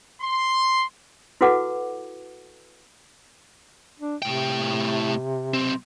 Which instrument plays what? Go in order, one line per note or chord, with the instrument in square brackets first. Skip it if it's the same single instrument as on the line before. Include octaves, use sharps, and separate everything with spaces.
[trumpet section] C6
[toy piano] E4 F#4 A4 B4 F#5 D6
[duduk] D4
[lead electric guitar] A2 G5 [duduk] C3
[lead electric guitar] B1 C4